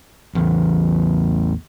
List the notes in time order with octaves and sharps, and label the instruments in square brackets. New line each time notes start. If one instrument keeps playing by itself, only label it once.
[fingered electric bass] A1 E2